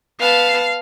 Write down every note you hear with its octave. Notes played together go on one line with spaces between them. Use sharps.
B3 F5 A5